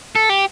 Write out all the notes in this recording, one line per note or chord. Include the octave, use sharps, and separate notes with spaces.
A4
G4